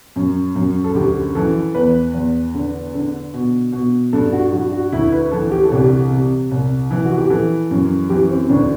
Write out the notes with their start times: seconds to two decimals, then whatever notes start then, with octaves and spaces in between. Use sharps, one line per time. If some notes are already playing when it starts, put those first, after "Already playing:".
0.16 F#2
0.56 F#2
0.84 A4
0.94 D2 G4
1.35 E3 A4
1.74 E2 B4
2.14 E2
2.54 D3
2.94 D3
3.34 B2
3.72 B2
4.13 G2 A4
4.33 F#4
4.52 G2 F#4
4.72 F#4
4.92 D2 E4
5.12 B4
5.31 E3 A4
5.51 G4
5.64 A4
5.71 C2 G4
6.11 C3
6.51 C2
6.91 E3
7.05 F#4
7.18 G4
7.30 E3 A4
7.71 F#2
8.09 E3 G4
8.29 C4
8.49 D2 D4